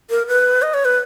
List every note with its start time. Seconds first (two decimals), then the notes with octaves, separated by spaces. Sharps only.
0.10 A#4
0.27 B4
0.62 D#5
0.74 C#5
0.85 B4